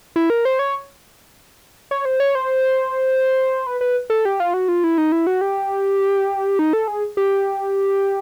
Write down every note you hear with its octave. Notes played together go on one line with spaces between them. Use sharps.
E4
A#4
C5
C#5
C#5
C5
C#5
C5
B4
B4
A4
G4
F4
F#4
F4
E4
D#4
E4
F#4
G4
D#4
A4
G#4
G4